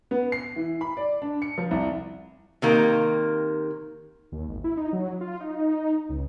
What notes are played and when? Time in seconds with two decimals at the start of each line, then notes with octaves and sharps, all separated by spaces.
0.11 B3
0.32 C7
0.56 E3
0.81 B5
0.97 D5
1.22 D4
1.42 C#7
1.58 F3
1.71 C2
2.62 C3 D#3 A#3
4.32 D#2
4.48 G#1
4.64 E4
4.77 D#4
4.93 F#3
5.21 F4
5.40 D#4
6.09 C#2